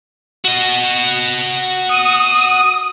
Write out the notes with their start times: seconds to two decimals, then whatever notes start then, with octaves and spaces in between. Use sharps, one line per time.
0.45 F#4 D#5
1.89 D#6